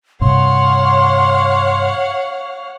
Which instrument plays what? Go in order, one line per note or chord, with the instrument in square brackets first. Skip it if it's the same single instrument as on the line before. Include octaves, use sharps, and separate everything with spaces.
[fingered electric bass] G2 C3 [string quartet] C#5 F5 F#5 [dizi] C6